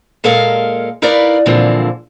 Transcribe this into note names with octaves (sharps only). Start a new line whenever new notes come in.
A#2 G#3 A4 A#4 F5
D#4 E4 A#4 B4 D5 F5
A#2 D3 E3 F3 G#3 C4